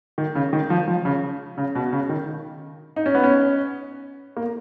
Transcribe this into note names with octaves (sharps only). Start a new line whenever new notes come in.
D#3
C#3
D#3
F3
F3
C#3
C#3
B2
C#3
D#3
D#4
C#4
B3
C#4
A#3